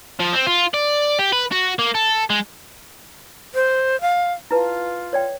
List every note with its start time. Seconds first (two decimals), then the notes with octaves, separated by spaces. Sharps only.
0.20 F3
0.33 C4
0.47 F4
0.74 D5
1.19 G4
1.33 B4
1.52 F#4
1.79 A#3
1.95 A4
2.30 G#3
3.55 C5
4.01 F5
4.51 E4 F4 B4 A5
5.13 C#5 D5 G5